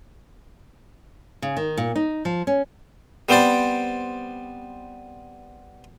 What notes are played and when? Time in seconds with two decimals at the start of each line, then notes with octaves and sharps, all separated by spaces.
1.42 C#3
1.57 D#3
1.77 A#2
1.96 D#4
2.25 F3
2.47 C#4
3.29 G3 B3 C4 C5 D5